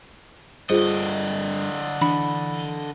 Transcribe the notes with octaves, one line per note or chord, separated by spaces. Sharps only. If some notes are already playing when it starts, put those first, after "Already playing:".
G2 D3 F4 G#4 C5 D#5
E3 D4 E4 B5